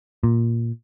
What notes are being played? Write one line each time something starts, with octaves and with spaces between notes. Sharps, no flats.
A#2